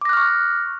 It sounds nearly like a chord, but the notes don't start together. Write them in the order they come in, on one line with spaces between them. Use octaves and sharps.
D6 A#6 F#6 F6 C#6